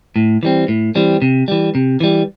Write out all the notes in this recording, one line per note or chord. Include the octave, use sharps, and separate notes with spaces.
A2
E3 G3 C4
A2
E3 G3 C4
C3
E3 G3
C3
E3 G3